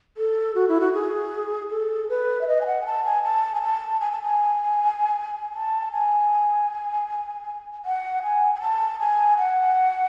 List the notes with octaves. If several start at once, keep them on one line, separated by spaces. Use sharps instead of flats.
A4
F#4
E4
F#4
G#4
A4
B4
E5
D#5
G#5
F#5
G#5
A5
G#5
A5
G#5
A5
G#5
A5
G#5
A5
G#5
F#5
G#5
G#5
A5
G#5
F#5